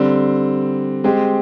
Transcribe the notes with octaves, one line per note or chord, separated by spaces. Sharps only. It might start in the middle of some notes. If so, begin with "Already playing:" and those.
Already playing: D3 G3 C4
G#3 C4 G4